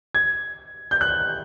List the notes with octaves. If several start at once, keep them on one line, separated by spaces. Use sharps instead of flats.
G#6
G6
F#6